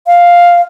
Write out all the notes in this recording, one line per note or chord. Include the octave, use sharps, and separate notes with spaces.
F5